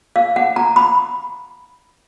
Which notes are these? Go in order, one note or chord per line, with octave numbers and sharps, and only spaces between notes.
F5
F#5
A#5
B5